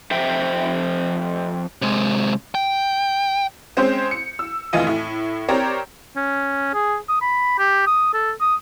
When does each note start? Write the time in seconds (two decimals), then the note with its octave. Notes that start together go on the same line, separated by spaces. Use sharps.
0.11 F2 C5 E5 G5
1.82 C3 G#3
2.55 G5
3.77 G#3 C4 C#4 C5 G6
4.11 C#7
4.39 E6
4.73 F1 D#2 E3 F4 D#5 D#7
4.87 A2 E4
5.49 C4 G4 A#4 C#5 D5 A#5
6.16 C#4
6.74 G#4
7.09 D#6
7.21 B5
7.59 G4
7.87 D#6
8.14 A4
8.41 D#6